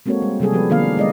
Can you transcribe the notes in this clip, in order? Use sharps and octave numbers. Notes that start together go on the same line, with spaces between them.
G#3 A#3 C4 F#4 A4 C#5
G3
C3 F#3 G3 G#4 A4
F3 B3 G4 A4 B4
D#3 A#3 B3 D4 B4 F5
G#3 D5 D#5